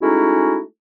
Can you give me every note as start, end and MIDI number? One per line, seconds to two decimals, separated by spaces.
0.02 0.59 56
0.02 0.59 57
0.02 0.59 61
0.02 0.59 63
0.02 0.59 64
0.02 0.59 66